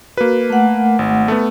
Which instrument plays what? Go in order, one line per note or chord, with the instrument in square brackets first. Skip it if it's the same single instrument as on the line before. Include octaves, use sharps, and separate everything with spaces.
[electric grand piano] A#3 B4 [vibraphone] F#4
[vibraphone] A3 F#5
[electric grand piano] G#1
A3 B3